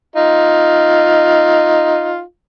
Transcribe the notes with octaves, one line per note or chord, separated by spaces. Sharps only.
D#4 F4